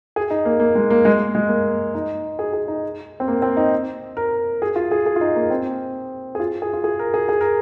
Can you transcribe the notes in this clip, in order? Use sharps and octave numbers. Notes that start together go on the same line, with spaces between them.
G#4
D#4
A#3
A#3
G#3
A#3
G#3
G#3
A#3
D#4
G#4
G#4
D#4
C4
A#3
C4
D#4
A#4
G#4
F4
G#4
G#4
F4
D#4
A#3
C4
G#4
F4
G#4
F4
G#4
A#4
G#4
G#4
A#4